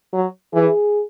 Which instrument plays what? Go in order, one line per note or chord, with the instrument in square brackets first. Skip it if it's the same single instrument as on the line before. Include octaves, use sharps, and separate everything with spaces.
[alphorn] F#3
[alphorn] E3 [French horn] G#4